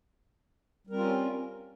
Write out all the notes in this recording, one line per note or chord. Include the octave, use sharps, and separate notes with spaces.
G3 C4 C#4 F4 A#4